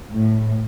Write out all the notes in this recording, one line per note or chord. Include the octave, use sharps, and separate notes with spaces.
A2